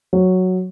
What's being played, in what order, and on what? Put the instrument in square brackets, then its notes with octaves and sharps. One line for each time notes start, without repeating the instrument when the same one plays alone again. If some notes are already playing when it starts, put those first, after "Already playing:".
[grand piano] F#3